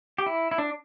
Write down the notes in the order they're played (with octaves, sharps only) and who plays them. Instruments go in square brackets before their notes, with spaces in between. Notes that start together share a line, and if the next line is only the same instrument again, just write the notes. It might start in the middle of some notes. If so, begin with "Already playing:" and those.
[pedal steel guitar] G4
E4
E4
D4